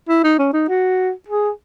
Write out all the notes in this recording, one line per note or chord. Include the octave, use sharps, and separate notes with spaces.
E4
D#4
C#4
D#4
F#4
G#4